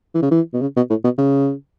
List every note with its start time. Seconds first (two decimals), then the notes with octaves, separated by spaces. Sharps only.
0.15 E3
0.23 C#3
0.32 E3
0.54 B2
0.62 C#3
0.77 B2
0.90 A2
1.05 B2
1.18 C#3